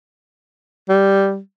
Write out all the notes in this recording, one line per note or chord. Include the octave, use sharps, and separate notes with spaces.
G3